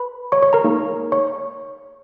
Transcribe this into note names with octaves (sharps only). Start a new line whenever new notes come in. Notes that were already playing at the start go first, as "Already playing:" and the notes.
Already playing: B4 B5
C#5 C#6
C#5 C#6
A#4 A#5
A#3 D#4 G#4
C#5 C#6